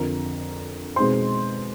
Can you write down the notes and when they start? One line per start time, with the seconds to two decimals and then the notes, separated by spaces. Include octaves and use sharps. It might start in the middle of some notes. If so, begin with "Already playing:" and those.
Already playing: F2 D3 F3 A#4 A#5
0.96 B2 G#3 C4 D#4 C5 C6